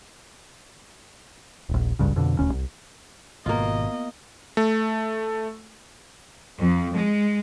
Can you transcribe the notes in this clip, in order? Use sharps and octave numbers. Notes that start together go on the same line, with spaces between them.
D#1 A#1
G#1 C#2 G2 C#3
F2 B2 D3
D#1 D2 C#4
C2
G#1 G#2 B2 A#3 B3 F4 D#5
A3
F2
G#3